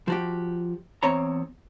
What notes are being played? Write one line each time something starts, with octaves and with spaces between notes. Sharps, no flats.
F3 F#4 G4
E2 C4 C#5 A#5